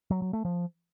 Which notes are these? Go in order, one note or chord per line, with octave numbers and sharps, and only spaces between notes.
F#3
F#3
A3
F3